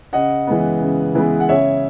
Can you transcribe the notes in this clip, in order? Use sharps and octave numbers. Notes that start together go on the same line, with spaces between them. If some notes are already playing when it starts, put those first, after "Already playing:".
C#3 D#5 F#5
E3 G#3 B3
C#3
E3 G#3 B3
F#5
C#3 C#5 E5